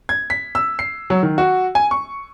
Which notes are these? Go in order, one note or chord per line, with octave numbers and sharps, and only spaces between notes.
G#6
B6
E6
C7
F#3
D#3
F#4
G#5
C#6